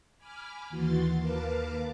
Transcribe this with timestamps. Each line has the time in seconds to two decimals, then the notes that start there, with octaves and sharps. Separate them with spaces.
0.18 G#5 B5 D6 F6
0.69 D#2 E3 F#4 C6 A6
1.18 D#2 A#4 B4 F5 A5 D6